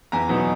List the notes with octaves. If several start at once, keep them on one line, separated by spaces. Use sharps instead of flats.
E2 G#5 A#5
B2 F#3 B3 D#4